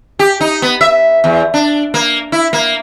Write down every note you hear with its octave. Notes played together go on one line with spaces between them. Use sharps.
G4
D#4
B3
E5
E2
D4
A#3
E4
A#3